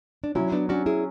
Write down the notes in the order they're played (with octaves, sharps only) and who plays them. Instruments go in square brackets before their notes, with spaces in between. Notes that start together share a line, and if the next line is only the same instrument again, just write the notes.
[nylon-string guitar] D4
[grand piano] F#3 [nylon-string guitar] C#4 E4
[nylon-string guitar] B3 D4
[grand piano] C#4 [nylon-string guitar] D4 F#4
[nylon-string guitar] E4 G#4